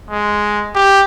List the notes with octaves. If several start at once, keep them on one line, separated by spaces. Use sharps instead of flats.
G#3
G4